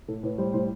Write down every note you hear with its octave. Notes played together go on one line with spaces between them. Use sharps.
A2 A4
A2 B4
G3 C5
A2 C5